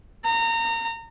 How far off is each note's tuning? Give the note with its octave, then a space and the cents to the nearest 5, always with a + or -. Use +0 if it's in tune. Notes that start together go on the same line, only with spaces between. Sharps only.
A#5 -25